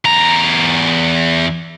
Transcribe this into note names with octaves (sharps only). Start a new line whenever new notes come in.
E2 A#5